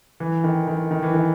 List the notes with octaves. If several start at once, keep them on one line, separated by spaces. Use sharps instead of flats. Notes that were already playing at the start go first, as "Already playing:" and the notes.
E3
D#3
D#3
D#3
E3
D#3